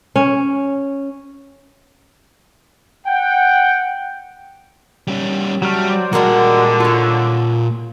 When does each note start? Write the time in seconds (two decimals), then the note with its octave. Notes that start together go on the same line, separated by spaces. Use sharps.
0.16 C#4
3.06 F#5 G5
5.07 G3 C#4
5.62 F#3 G3 A3 F6
5.88 C5 D5
6.13 A#2 D3 G3 G#3 F#4 A#4 F#5
6.80 F4 A4 C#5